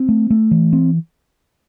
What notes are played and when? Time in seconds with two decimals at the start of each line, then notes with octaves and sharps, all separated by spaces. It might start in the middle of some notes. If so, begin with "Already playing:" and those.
Already playing: C4
0.09 A3
0.30 A3
0.51 E3
0.73 C4